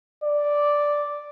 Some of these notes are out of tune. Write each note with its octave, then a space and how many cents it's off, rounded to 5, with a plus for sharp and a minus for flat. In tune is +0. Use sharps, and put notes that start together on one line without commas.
D5 -5